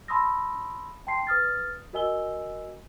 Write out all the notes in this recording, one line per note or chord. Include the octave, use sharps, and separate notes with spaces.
A5 B5 C6 D#6 E6 A#6
G5 A5 C6 C7
B4 D#6 F6 A6
F#4 A#4 D#5 G#5 E6 G7